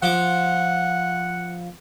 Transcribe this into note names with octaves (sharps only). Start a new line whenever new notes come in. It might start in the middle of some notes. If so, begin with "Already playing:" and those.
F3 F#5 D6